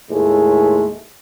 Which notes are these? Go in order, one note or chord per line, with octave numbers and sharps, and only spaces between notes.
D#2 A2 G#3 A3